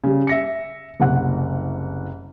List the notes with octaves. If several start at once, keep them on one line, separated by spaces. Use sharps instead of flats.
C#3 G3
E5 A#6 C#7
F#1 C2 F#5